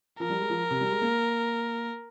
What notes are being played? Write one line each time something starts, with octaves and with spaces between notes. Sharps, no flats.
F3 A#4
G3
G#3
F3
C3
G3
G#3
A#3